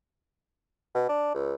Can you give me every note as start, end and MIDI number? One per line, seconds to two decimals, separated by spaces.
0.95 1.04 47
1.09 1.32 62
1.35 1.55 37